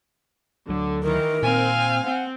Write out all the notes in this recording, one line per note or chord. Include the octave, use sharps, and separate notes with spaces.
D2 D3 F#3
D#3 E3 A#4
A#2 C4 F5 G#5
C4 F#5